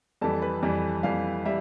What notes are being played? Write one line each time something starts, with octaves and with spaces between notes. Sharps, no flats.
F2 E3 G3 A4 A5
B4 B5
F2 E3 G3
F2 E3 G3 F5
G3 E5